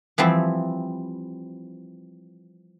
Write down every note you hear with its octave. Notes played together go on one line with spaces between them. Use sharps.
E3 F3 G3 C4 E4